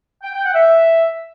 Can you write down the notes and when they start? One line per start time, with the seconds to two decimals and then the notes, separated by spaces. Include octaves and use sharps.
0.23 G5
0.33 G5
0.44 F#5
0.54 E5